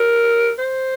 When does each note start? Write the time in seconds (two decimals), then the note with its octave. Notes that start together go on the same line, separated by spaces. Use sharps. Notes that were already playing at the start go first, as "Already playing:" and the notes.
Already playing: A#4
0.59 C5